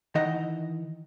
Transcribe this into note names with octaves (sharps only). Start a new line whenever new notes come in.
D#3 E3 D#4 D#5 F#5